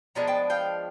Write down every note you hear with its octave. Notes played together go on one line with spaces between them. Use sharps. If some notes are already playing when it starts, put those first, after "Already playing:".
F3 G#3 B3 D4 G#5 A#5
G5 A5
F5 G5